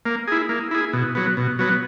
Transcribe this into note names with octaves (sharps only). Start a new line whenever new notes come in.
A#3
E4 G#4
A#3
E4 G#4
B2
F#3 B3
B2
F#3 B3